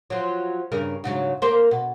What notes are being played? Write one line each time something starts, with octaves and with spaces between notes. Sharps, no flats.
F3 F#3
G2 C#3 A#4
G#2 C#3 F#3
A#3 A#4 C5
B2